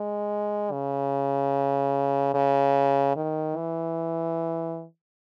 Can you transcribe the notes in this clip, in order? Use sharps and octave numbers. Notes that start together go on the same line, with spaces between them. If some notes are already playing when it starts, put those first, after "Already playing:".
Already playing: G#3
C#3
C#3
D#3
E3